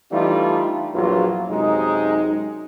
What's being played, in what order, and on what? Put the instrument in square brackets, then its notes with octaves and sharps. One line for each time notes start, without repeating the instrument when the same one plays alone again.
[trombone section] E3 G3 A3 D4 D#4 F4
A#1 E2 E3 F#3 F4
F#2 C3 G#3 D#4